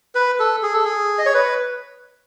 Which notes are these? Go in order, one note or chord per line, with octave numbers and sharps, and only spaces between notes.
B4
A4
G#4
A4
G#4
D#5
C#5
B4